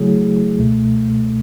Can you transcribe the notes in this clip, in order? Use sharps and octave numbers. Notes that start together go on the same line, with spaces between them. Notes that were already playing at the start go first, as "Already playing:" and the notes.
Already playing: C#3 F#3 A3 E4 G#4
C#2 B2 A3